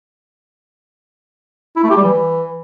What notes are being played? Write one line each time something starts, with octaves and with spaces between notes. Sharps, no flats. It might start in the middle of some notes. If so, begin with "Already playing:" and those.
E4
A3
G4
G3
E3